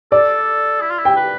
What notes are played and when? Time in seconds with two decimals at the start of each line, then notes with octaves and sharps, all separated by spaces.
0.12 A4 D5
0.81 E4
0.91 F4
0.99 E4
1.05 G5
1.16 B4